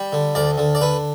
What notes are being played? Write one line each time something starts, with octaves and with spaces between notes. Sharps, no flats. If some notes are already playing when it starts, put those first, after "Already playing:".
Already playing: G3
D3
D2 D5
D3
D5
D3 B4